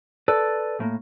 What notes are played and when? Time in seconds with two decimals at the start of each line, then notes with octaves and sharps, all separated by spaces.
0.28 A4 B4 D5
0.80 A2 A#3